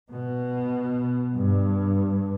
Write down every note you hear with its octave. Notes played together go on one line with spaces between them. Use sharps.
B2
G2